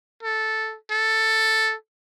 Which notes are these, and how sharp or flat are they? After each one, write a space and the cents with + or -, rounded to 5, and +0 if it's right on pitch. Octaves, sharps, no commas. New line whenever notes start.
A4 -5
A4 +5